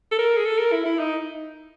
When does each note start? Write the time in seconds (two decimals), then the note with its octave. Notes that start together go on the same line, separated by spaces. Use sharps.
0.12 A4
0.19 A#4
0.37 G#4
0.46 A4
0.59 A#4
0.72 E4
0.85 E4
0.99 D#4